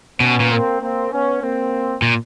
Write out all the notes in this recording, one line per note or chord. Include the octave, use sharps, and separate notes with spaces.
B2 B3 C#4
A#2
A#3 C4
A#3 C4
B3 C#4
A#3 C4
A#2